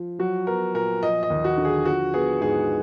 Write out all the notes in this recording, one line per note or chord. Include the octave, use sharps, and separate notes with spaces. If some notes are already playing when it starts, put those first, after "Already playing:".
Already playing: F3
F#3 F#4
B3 A#4
A#2 A#4
F3 D#5
D#5
D#2
F#4
D3
G#4
F3 F#4
B3 G#4
G#2 G#4